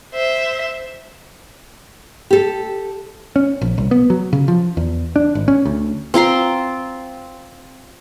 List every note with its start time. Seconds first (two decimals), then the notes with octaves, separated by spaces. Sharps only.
0.14 C5 E5
2.31 G4 A4
3.36 C#4
3.61 A#1
3.78 C2
3.91 B3
4.10 F#3
4.33 C#3
4.48 F3
4.77 E2
5.16 D4
5.35 G#1
5.48 C#4
5.66 D2
6.14 C4 F4 A#5 C6